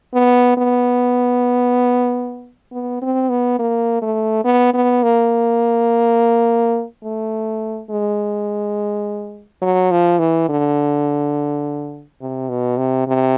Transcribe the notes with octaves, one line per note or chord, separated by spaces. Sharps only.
B3
B3
B3
C4
B3
A#3
A3
B3
B3
A#3
A3
G#3
F#3
F3
E3
D3
C3
B2
C3
C3